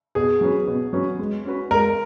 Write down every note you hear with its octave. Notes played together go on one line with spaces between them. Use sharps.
B2 G#4
F#3 C#4 F#4 B4
B2
F#3 C#4 F#4 B4
G#3
C#4 F#4 B4
G#3 A#4